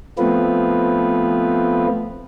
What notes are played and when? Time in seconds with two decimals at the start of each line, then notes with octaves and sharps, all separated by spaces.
0.18 F3 A3 B3 C4 F4 B4